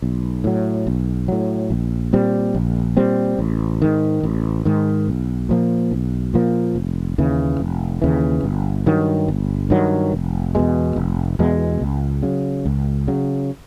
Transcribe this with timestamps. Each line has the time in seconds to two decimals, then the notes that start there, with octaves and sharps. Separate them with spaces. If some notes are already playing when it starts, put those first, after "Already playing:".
0.02 B1
0.44 A2 F#3
0.87 B1
1.28 A2 F#3
1.70 A#1
2.13 A#2 G3 C4
2.55 A#1
2.97 A#2 G3 C4
3.39 A1
3.82 G#2 D#3
4.23 A1
4.65 G#2 D#3
5.08 B1
5.49 A#2 F3 A#3
5.91 B1
6.34 A#2 F3 A#3
6.75 F1
7.18 D#2 C#3 E3
7.60 F1
8.02 D#2 C#3 E3
8.44 G1
8.86 G2 D#3 F#3
9.28 G1
9.70 G2 D#3 F#3
10.12 F1
10.55 E2 B2 G#3
10.96 F1
11.39 E2 B2 G#3
11.81 C#2
12.23 C#3 F#3
12.65 C#2
13.08 C#3 F#3